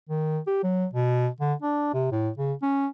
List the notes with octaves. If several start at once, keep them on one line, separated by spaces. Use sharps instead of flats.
D#3
G4
F#3
B2
D3
D4
C3
A2
C#3
C#4